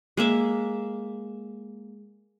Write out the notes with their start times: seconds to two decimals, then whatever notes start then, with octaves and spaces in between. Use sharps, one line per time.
0.17 G#3 A#3 E5 D6